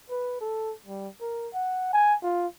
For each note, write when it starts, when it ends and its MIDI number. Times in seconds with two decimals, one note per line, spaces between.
0.10 0.38 71
0.41 0.73 69
0.86 1.08 55
1.21 1.49 70
1.54 1.90 78
1.93 2.15 80
2.23 2.47 65